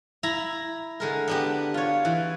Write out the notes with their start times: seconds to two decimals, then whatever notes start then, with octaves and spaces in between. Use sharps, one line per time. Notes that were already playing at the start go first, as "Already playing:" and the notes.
0.23 E4 A#5 B5
1.00 D3 G#3 A#4
1.28 B3 D4 G4
1.74 F4 C#5
2.05 E3